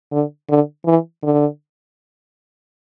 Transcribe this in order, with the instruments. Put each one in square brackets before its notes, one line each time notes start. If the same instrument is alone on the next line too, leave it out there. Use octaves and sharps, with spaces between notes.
[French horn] D3
D3
E3
D3